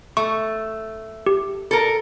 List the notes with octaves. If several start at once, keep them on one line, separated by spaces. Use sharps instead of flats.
A3 C#6
G4
A4 A#4